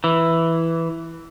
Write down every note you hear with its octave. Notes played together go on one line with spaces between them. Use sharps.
E3